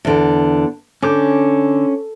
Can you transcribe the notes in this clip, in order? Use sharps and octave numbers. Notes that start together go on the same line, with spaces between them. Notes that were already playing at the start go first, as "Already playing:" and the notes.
E2 D3
D3 C#4 D6 G6